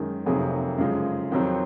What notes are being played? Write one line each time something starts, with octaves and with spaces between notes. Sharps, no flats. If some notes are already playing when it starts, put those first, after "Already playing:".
Already playing: F#2 D#3 G#3
F1 F2 C3 F#3 A#3 G#4
F#2 C#3 F3 G#3
F2 D#3 F#3 C4